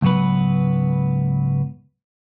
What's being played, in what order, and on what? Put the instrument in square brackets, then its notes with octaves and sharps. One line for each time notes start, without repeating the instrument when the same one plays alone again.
[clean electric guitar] C#2 G#2 F#3 B3 B4